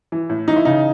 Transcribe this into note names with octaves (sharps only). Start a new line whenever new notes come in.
E3
A2
E3 D#4
E4
C#3 D#4